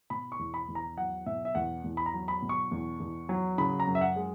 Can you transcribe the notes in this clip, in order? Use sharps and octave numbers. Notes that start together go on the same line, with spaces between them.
B2 B5
C#6
E2
B5
E2
A#5
F#3 F#5
B2 E5
E5
E2 F#5
E2
B5
A#5
F#3
B5
B2
C#6
E2
E2
F#3
C#3 B5
A#5
F#2
E5
F#5
G#3